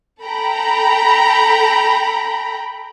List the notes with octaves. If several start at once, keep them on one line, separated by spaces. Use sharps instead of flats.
A4 G5 A#5 B5